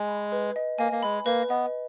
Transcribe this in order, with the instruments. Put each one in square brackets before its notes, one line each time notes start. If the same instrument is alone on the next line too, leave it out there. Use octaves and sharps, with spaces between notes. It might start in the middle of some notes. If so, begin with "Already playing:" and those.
Already playing: [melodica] G#3 [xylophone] G#5
[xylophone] B5
B4
D#5
[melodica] A#3 [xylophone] G#5
[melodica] A#3
[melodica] G#3 [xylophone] B5
[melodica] A#3 [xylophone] B4
[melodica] B3 [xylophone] D#5